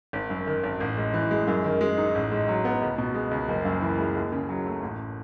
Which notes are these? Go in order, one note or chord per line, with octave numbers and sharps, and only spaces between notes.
G#1
F#2
D#3
G#1
A1
G#2
E3
G#3
F#2
D#3
G#3
D#4
A1
G#2
F#3
B3
C#2
B2
G#3
C#2
F#1
F#2
E3
G#3
D#2
C#3
F#3
A3
A1